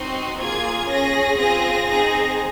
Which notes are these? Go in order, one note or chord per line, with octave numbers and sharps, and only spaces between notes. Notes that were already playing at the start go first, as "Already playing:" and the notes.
Already playing: C4 D#4 F#4 C6
A#3 F4 G#4 G#6
C#4 G#4 A#6
C4 F4 G#4 A#6
C4 D#4 G#4